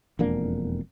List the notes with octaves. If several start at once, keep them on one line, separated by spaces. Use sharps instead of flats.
E1 F2 A#3 D4